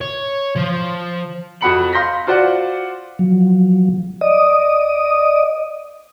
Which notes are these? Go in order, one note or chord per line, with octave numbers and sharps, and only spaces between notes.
C#5
F3
F2 F#4 F#5 B5 C#7 F#7
F5 C6 G6 A#6 B6
F4 F#4 C5 D5 F#5
F3 F#3
D5 D#5 D#6